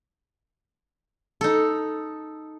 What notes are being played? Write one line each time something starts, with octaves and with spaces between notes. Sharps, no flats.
D#4 A4